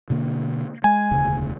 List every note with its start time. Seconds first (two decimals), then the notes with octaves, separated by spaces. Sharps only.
0.10 B2 D3 A#3
0.84 G#3 G#5
1.11 E1 D2 C#3